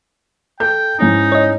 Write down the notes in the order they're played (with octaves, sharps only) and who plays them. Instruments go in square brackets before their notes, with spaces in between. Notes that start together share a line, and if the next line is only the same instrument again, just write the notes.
[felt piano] A4 G6 [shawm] G5
[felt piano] G#2 C#4 E4 [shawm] D#4
[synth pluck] C#5 D#5